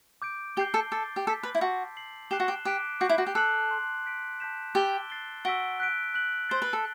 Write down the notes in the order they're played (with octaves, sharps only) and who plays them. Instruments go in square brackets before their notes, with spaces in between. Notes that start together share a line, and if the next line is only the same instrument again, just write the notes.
[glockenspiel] D6 G6 D7
[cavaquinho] G4 [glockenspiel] G6 C7 G7
[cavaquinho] A4
[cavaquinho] A4 [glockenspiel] D6 A6 C7
[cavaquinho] G4
[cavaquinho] A4 [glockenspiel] E6 G6 B6
[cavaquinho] B4
E4
[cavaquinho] F#4 [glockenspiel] A5 C6 G6 C7
[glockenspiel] G6 C7 F#7
[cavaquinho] G4 [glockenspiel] F#6 C7 E7 G7
[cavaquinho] F#4
G4
[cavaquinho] G4 [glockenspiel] D6 F#6 B6 D7
[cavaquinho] F#4 [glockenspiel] D6 G6 C7
[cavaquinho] E4
F#4
G4
[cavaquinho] A4 [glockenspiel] F#6 C7 F#7
[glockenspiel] A5 C6 G6
G6 B6 D7
A5 D6 G6 B6 E7
[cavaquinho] G4 [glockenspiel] E6 A6 D7 G7
[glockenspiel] F#6 A6 C7 G7
[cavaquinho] F#4 [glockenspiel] E6 B6 D7 G7
[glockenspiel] F#6 B6 D7
F#6 B6 F#7
[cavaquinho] C5 [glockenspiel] F#6 A6 C7 G7
[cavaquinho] B4
A4